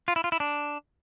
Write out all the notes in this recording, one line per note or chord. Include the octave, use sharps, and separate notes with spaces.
F4
E4
F4
E4
D4